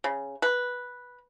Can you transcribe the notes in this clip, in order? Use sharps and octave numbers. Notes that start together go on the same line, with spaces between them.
C#3
B4